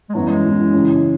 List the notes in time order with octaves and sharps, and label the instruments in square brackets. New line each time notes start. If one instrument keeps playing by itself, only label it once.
[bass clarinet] G#3
[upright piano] F#2 E3 B3 E4 [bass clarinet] F#3
[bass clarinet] G#3
[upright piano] F#2 E3 B3 E4
C#3 E3 C#4 E4